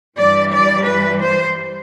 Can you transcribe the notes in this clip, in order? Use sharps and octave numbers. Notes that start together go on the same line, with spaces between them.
G2 E3 G3 D5
D5
B4
C5